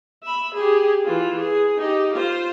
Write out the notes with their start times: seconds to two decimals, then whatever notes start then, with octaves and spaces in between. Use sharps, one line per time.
0.23 E5 B5
0.55 G4 G#4
1.05 E3 F4
1.39 G#4
1.78 D#4 G4
2.14 F4 C5